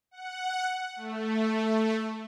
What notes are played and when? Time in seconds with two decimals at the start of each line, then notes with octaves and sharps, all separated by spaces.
0.11 F#5
0.96 A3